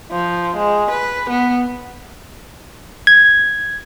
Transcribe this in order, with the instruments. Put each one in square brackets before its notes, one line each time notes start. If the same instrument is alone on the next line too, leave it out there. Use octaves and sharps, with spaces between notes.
[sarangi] F3
G#3
B4
B3
[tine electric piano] G#6